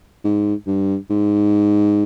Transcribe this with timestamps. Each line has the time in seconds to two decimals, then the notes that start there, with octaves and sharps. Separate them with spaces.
0.24 G#2
0.67 G2
1.10 G#2